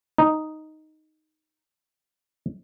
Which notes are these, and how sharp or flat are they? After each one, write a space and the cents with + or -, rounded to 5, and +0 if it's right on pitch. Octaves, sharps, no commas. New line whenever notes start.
D#4 +0